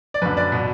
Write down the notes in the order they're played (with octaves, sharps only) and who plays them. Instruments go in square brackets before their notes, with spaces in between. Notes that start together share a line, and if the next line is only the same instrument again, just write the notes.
[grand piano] D5
F#2 D3 B4
D5
B2